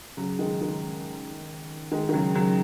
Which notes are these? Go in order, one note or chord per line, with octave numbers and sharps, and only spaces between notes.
C#3 F#3
D#3 G#3
D#3 G#3
D#3 G#3
D#3
C#3 F#3
C#3 F#3